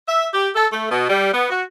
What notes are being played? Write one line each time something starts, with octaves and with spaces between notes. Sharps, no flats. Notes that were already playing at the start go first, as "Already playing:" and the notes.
E5
G4
A4
A3
B2
G3
B3
F#4